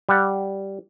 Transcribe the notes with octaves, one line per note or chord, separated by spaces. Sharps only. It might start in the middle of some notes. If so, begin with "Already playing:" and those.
G3 F#5